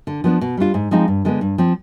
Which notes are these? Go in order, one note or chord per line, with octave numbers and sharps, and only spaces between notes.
D3
F3 B3 D4
B2
G3 D4 F4
G#2
F3 G#3 C4 D#4
G2
D3 G#3 B3
G2
F3 C4